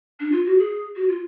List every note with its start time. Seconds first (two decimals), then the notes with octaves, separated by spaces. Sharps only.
0.20 D4
0.32 F4
0.46 F#4
0.58 G#4
0.96 F#4
1.09 F4